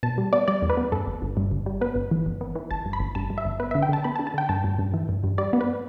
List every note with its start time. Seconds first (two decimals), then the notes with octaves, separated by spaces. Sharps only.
0.03 B2 A5
0.18 G3
0.33 B3 D5
0.48 G3 D5
0.62 E2
0.70 B4
0.77 B3
0.92 G2 A4
1.07 G1
1.22 G1
1.37 G2
1.52 G1
1.66 G3
1.81 B3 B4
1.96 G1
2.11 E3
2.26 G1
2.41 B3
2.55 E3
2.71 G1 A5
2.86 G2
2.93 B5
3.00 G1
3.15 G2 A5
3.30 G2
3.38 E5
3.45 G1
3.60 B3 B4
3.71 D3 E5
3.82 G5
3.89 D3 A5
4.04 B3 B5
4.16 A5
4.19 D3
4.27 A5
4.34 D3 G5
4.49 G2 A5
4.64 G2
4.79 G2
4.94 E3
5.09 G2
5.24 G2
5.38 G3 D5
5.53 B3
5.61 B4